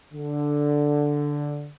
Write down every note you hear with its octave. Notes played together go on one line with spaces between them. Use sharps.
D3